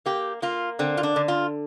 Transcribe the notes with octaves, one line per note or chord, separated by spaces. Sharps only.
A#3 G4
A#3 F4
D3 C4
F4
D4
D3
F4